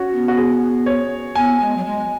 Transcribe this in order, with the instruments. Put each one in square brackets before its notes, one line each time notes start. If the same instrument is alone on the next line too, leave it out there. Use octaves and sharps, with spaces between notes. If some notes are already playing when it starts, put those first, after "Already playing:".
Already playing: [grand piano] C#4 F#4
[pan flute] B3
[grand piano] F#4
G#4
C#5
[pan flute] B3 [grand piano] G#5
[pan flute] G#3
F#3
G#3